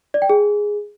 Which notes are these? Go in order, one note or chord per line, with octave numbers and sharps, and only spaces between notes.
D5
G5
G#4